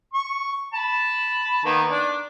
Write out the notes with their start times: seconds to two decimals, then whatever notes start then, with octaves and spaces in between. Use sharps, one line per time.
0.13 C#6
0.74 A5 B5
1.65 D#3 A#3 B3
1.90 D4